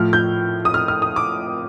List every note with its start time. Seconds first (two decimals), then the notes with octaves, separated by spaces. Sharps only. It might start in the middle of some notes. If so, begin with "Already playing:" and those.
Already playing: A2 F3 F6
0.13 G6
0.65 D#6
0.74 F6
0.88 F6
1.02 D#6
1.16 D6